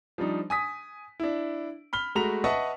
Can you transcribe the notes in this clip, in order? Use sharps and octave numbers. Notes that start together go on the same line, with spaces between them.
F3 G3 D4 D#4
G#5 D#6 B6
D4 E4
B5 F6 G7
G#3 A3 F#4 A#5 B5 F7
B4 D#5 E5 F#5 A5 C#6